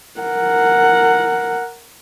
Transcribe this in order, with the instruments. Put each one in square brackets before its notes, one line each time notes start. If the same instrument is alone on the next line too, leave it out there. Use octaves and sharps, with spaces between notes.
[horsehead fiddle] A#4 F#5